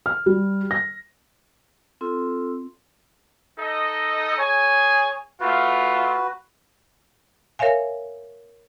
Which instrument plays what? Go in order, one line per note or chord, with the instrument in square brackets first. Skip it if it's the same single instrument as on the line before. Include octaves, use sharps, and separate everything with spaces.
[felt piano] F6
G3
A#6
[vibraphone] C4 F4 A4 C6 E6
[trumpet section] D#4 A4 D#5
[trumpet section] G#4 G#5 [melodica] C#5
[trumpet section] A3 F4 [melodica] F#4 B4
[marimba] A#4 C#5 E5 F5 G#5